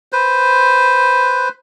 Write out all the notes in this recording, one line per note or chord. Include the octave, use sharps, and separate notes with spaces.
B4 C5